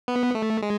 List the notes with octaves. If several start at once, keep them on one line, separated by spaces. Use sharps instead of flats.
B3
A3
G#3